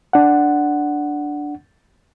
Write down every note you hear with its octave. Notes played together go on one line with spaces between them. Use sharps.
D4 F#5